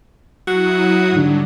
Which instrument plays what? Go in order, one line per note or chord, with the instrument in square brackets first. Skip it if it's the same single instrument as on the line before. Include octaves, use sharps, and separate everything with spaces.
[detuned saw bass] F#3 [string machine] E4 D#6 [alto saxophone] F#4
[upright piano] G#2 D3 [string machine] G3 D4